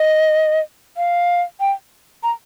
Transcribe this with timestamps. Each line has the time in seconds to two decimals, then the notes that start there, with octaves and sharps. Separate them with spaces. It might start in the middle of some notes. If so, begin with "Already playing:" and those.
Already playing: D#5
0.97 F5
1.60 G5
2.23 A#5